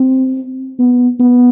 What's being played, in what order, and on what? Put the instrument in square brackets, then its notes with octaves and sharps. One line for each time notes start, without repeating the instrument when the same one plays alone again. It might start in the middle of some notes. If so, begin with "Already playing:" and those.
Already playing: [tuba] C4
B3
B3